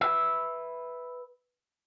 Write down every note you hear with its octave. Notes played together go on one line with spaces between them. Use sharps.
B4 E5